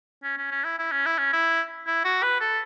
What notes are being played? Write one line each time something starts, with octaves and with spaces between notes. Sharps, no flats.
C#4
C#4
C#4
E4
E4
C#4
E4
C#4
E4
E4
F#4
B4
A4